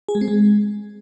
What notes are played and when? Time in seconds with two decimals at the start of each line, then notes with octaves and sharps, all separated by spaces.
0.09 G#4
0.15 G#3
0.21 C4
0.28 G#3